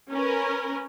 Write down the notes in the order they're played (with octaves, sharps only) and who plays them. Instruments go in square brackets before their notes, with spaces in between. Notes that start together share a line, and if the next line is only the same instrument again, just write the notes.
[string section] C#4 A#4 B4